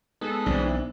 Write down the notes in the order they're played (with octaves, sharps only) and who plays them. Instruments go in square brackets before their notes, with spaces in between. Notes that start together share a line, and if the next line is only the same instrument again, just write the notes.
[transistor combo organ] G#3 B3 D#4 [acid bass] A4
[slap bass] B1 [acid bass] E3 [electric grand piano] C4 D4